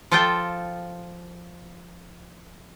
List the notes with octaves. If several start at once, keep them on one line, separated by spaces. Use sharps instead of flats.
F3 F4 A4 C5 G5